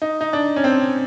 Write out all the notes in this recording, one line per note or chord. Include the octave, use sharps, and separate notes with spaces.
D#4
D#4
D4
C#4
C4